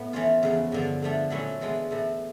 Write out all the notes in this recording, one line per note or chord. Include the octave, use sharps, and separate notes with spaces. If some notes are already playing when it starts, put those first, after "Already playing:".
Already playing: A2 B3
E3 A3 C#4 F4
E2 C#3 F3
G2 D3 F3
D3 F3 A3 D4
A#2 F#3 A3 C#4 E4
E3 G#3 B3 D4 F4
A2 E3 A3